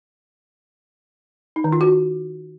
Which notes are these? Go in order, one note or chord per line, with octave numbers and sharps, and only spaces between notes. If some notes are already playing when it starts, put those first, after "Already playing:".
D#4
D#3
F4
F#4